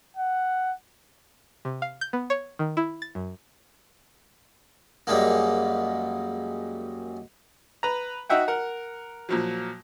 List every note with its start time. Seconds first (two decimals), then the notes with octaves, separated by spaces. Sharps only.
0.17 F#5
1.65 C3
1.82 F5
2.01 G6
2.13 B3
2.30 C#5
2.59 D#3
2.77 E4
3.02 A6
3.15 F#2
5.07 F#2 G3 G#3 A#3
7.83 B4 A#5
8.29 D#4 F#4 E5 F#5 G5
8.48 A#4 F#5
9.29 A#2 F3 F#3